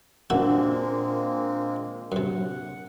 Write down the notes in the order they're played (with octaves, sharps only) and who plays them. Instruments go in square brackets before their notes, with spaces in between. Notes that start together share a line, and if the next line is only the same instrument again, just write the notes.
[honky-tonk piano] A#2 D4 [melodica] G#3 A#3 C4 [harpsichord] F#4 E5 F#5
[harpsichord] F#2 C3 [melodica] F#5